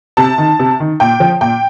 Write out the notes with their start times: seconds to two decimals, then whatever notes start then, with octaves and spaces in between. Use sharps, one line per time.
0.17 C3 A5
0.38 D#3
0.59 C3
0.80 D#3
1.00 A#2 G5
1.20 F3
1.41 A#2 G5